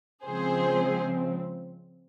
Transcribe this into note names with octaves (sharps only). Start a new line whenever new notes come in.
C#3 F3 G#3 C4 G#4 C5